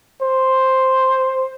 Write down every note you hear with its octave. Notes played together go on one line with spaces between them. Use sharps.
C5